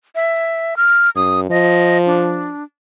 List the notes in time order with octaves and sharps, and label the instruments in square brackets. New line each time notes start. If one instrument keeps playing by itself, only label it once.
[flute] E5
F6
[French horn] F#2 [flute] D#6
[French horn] F3 [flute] D#5
[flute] D4